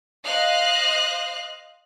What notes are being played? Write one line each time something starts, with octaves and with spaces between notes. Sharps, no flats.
C5 D#5 F5 F#6